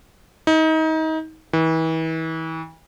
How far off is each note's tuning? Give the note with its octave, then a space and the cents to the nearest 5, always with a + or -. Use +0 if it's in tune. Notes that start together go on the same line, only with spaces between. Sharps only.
D#4 +30
E3 -35